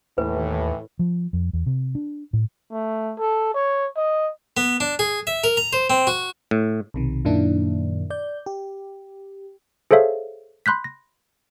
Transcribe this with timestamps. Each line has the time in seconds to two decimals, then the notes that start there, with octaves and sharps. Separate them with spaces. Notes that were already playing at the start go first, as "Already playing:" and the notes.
0.18 D#2 A2 E3 B4
0.99 F3
1.33 F2
1.53 E2
1.66 C3
1.95 D4
2.33 A2
2.72 A3
3.19 A4
3.54 C#5
3.96 D#5
4.57 B3
4.80 D4
4.99 G#4
5.27 E5
5.44 A#4
5.57 A#5
5.73 C5
5.90 C4
6.07 F#4
6.51 A2
6.94 B1 C3 D#3
7.25 F#2 A#2 D#3 A#3 D4 E4
8.10 D5 G6
8.46 G4
9.91 G#4 A4 C5 C#5 E5 F5
10.66 B5 C6 F#6 G6 B6
10.84 A#6